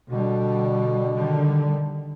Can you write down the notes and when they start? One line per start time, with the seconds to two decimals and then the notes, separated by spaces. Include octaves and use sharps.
0.10 B2 D3 G3
1.13 D3 D#3 G3